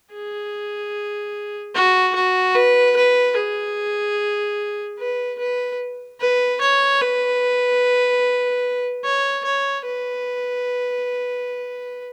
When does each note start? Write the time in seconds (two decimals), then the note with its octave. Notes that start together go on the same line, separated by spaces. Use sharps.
0.12 G#4
1.75 F#4
2.15 F#4
2.55 B4
2.96 B4
3.37 G#4
4.99 B4
5.39 B4
6.20 B4
6.61 C#5
7.01 B4
9.04 C#5
9.45 C#5
9.85 B4